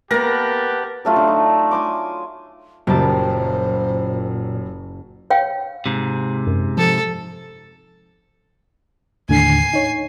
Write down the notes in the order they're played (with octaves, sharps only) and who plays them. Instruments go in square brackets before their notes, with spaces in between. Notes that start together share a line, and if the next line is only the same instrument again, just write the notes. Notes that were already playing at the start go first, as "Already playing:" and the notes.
[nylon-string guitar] A#3 B3 [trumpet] G4 [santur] A#4 A#5 [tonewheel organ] B4 F#5 A5
[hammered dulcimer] F#3 A3 F4 A4
D3
D#4
G#5 C6 D6
[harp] F#1 G5 A5 [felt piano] F#2 F#3 G3 [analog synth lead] A#2 [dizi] C5
[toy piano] C#5 F5 G5
[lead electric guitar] G#2 C3
[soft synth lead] F#2
[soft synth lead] F3 [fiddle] A4
[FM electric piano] D#2 A2 D3 [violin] G#5 C7
[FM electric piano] D#4 C#5